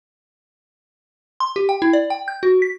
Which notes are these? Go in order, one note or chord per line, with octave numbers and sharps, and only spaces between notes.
C6
G4
G5
E4
D5
G5
G6
F#4
B6